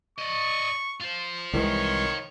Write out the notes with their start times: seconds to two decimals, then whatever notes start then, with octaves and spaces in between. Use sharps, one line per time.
0.18 D5 D#5 C#6
1.00 F4 C5
1.53 C2 D#3 E3 G#3 C#5